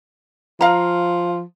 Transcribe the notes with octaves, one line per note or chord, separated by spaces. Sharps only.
F3 F5 A#5